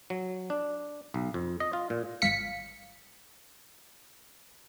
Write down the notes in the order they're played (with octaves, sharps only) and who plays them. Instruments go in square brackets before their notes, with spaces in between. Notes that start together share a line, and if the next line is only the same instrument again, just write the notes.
[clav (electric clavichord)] F#3
D4
B1
F2
D#5
F4
A#2
[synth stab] G#1 F5 B6 C#7